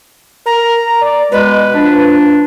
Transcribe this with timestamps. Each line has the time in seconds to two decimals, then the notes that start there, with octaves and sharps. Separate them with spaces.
0.46 A#4 A#5
1.01 D5
1.32 B2 G#3 B4
1.75 F3 D4